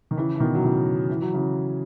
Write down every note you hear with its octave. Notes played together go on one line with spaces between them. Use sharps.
D#3
C#3 E3
E3
B2 D#3
F#3
C#3 E3
E3
F#3
C#3 E3